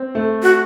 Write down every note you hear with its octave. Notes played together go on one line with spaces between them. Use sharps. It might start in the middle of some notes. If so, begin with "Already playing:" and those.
Already playing: C4
A3
F#4